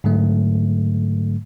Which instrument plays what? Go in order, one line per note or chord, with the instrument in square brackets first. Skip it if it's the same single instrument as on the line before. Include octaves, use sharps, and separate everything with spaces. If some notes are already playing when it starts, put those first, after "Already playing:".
[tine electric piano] G#2 D3 F#3 A3